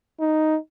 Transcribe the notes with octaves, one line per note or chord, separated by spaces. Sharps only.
D#4